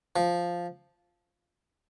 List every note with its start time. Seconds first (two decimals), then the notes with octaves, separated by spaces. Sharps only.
0.16 F3